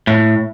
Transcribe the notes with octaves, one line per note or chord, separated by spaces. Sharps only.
A2